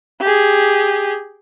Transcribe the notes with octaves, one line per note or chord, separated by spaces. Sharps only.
G4 G#4